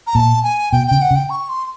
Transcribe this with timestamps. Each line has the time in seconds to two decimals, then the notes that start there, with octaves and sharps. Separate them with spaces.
0.07 A#5
0.15 A#2 A5
0.43 G#5
0.72 B2 G5
0.87 C#3 G5
1.01 F#5
1.11 C#3
1.15 G5
1.30 C#6
1.49 C6